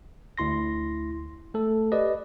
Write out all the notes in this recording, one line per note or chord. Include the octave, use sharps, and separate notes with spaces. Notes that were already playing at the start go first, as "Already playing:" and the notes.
D2 E4 C6 A#6
A3 A4
G4 B4 D5 D#5